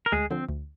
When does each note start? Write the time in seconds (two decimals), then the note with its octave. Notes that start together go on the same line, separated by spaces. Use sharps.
0.06 A#4
0.12 D2 G#3 G#4
0.31 D3 F3 C4
0.49 D2